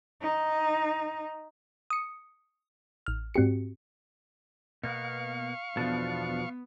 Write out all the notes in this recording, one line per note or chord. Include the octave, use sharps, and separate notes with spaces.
D#4
D#6 C#7
A1 F6
G#2 C4 F#4 G4 C#7
B2 A#3 B3 F5 C#6
E2 B2 F3 B3 D4 A4